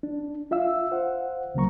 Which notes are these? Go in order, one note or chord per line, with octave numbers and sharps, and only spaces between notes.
D4
F4 E5 F5 E6
C5 F5 F#5
C#2 C#3 F#3 A#3 A#5 C#6